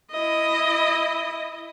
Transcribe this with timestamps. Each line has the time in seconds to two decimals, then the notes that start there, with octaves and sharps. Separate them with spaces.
0.12 E4 D#5